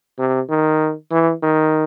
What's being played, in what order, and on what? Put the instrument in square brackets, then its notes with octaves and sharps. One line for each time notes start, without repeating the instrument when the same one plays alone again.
[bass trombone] C3
D#3
E3
D#3